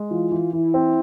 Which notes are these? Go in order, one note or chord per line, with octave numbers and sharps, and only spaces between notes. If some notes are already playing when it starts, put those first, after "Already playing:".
Already playing: G#3
E3 F4
E3
E3 E4
C4